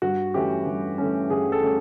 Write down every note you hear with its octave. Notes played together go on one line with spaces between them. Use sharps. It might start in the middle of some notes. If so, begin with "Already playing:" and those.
G2 F#4
E3 A3 C#4 G4
G2
E3 A3 C#4
G2 G#4
A4
E3 A3 C#4